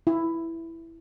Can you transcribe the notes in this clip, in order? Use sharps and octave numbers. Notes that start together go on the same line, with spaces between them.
E4